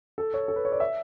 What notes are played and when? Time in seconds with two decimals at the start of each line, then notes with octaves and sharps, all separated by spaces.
0.18 A4
0.34 C#5
0.48 A4
0.56 B4
0.65 C#5
0.72 D5
0.80 E5